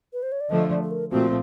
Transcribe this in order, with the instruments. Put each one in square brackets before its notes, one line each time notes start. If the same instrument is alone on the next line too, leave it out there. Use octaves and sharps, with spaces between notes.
[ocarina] B4
C5
C#5
D5
[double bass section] D3 F3 A3 [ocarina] D#5
[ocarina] D5
A4
A#4
[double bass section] A#2 F3 A3 C4 [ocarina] F#4